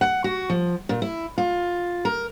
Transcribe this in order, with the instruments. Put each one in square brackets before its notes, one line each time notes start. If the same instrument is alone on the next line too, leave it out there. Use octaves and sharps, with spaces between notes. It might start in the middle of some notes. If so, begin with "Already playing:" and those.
[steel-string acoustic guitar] F#5
F#4
F3
A#2
E4
F4
A#4